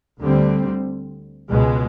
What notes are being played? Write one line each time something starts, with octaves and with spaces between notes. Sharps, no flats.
D2 D3 G3 C4
C#2 B2 G#3